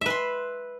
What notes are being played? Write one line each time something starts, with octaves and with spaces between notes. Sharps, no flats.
B4 E5 C6